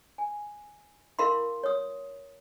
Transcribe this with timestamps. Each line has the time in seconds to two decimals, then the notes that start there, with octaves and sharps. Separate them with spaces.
0.18 G#5
1.19 E4 A#4 F5 B5 C6
1.63 C#5 D#6